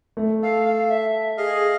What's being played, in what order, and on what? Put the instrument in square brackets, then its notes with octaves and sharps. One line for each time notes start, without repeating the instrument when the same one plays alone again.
[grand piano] A3
[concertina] A4 [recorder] F5
[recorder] E5
[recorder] G#4 [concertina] D#5 F5